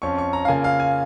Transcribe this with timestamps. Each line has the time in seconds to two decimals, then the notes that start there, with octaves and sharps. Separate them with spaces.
0.02 F2 F3 C#4 C#6
0.18 C#6
0.33 A#5
0.45 F5
0.48 C#3 A#3 F4 G#5
0.64 F5
0.80 G#5